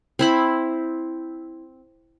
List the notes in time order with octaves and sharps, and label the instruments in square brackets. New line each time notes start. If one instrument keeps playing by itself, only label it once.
[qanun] C4 E4 B5